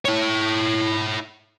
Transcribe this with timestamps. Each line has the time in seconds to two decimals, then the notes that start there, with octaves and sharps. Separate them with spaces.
0.05 E4 C#5